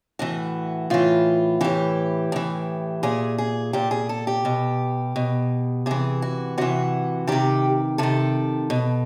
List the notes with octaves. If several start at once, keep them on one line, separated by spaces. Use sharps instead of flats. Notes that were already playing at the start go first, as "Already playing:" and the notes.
A2 E3 F#4
A2 E3 F4
A2 E3 G4
A2 E3
A#2 G#4
G#4
A#2 G4
G#4
A4
G4
B2
B2
C3 E3 G#4
F#4
C3 E3 F#4
C3 D#3 G4
C3 D#3 A4
B2